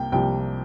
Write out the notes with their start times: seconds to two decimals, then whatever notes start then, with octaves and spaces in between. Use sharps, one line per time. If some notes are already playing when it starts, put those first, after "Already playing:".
Already playing: C2 C3 A#3 G5
0.12 C2 C3 F3 A#3 G5